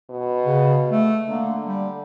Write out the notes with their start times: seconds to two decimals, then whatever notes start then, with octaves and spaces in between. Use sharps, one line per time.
0.10 B2
0.45 C#3
0.90 A3
1.29 D3 A#3
1.67 G3